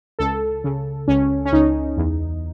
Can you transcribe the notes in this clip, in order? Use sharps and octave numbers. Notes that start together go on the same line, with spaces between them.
C#2 A4
C#3
C#2 C#4
C#4
C#2 D#4
E2